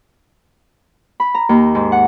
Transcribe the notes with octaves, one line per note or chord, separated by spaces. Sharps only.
B5
A#5
D#2
G#2
F#5